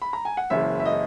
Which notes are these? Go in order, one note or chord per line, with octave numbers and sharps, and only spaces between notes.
B5
A#5
G#5
F#5
F#1 F#2 E3 G#3 E5
E5
D#5